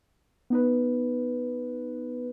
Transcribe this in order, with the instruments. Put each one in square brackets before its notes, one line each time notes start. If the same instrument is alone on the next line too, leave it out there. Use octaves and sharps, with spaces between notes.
[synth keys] B3 D#4 B4